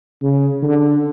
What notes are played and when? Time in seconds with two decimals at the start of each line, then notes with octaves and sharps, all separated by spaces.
0.22 C#3
0.63 D3